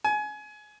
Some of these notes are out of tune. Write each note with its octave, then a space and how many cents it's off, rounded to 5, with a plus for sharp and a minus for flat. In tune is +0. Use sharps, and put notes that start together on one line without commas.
G#5 +25